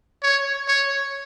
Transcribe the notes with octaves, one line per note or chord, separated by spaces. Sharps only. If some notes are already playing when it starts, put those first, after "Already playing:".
C#5
C#5